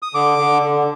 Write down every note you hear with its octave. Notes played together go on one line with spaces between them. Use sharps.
D#6
D3 D6
D3
D3